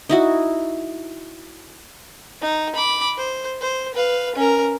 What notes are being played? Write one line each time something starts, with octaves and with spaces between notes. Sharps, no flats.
D#4 E4 F#4
D#4
B5 D6
C5
C5
B4 F5
C#4 A#4